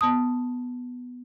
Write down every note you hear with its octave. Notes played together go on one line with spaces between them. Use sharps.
B3 A5 D#6